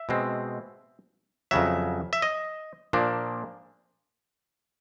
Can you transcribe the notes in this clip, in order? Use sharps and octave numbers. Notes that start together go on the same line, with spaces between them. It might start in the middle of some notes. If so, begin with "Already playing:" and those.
Already playing: E5
B2 G#3 C4
F2 C#3 F#3 E5
E5
D#5
A#2 F3 A#3 D4